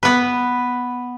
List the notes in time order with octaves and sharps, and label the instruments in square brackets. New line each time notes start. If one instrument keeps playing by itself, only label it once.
[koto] B3 B4